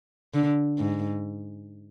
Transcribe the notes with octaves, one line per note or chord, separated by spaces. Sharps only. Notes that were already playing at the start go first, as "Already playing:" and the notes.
D3
G#2